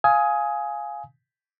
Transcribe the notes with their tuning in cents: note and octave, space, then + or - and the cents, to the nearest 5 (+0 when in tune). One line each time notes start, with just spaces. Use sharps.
F5 +0 G#5 +5 D#6 +20